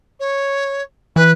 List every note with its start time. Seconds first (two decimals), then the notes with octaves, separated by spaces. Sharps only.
0.20 C#5
1.16 E3 B4